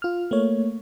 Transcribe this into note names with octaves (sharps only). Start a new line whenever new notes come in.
F4 F6
A3 A#3 C#5